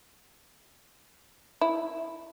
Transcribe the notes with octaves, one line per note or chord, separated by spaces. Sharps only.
E4